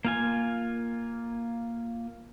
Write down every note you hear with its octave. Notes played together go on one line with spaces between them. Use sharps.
A#3 F4 G#5